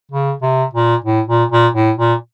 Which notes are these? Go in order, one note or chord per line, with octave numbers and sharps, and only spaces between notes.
C#3
C3
A#2
A2
A#2
A#2
A2
A#2